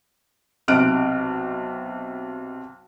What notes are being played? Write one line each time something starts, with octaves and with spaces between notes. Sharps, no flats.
B1 C3 F6 F#6 D7